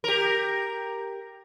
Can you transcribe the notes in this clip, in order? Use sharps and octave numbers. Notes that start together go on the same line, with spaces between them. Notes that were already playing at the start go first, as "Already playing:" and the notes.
G4 A#4